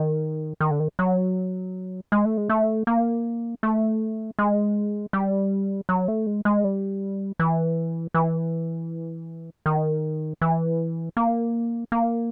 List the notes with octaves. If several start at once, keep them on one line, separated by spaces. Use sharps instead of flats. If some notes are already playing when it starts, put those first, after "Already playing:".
Already playing: D#3
D#3
D3
D#3
F#3
G#3
A3
G#3
A3
A#3
A3
G#3
G3
F#3
A3
G#3
G#3
G3
E3
E3
D#3
E3
A#3
A#3